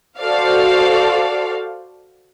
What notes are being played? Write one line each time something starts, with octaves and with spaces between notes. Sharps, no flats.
F#4 A4 C5 D5 F5